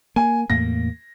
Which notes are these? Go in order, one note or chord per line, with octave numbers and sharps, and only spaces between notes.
A#3 G#5
E2 A2 A#3 A#6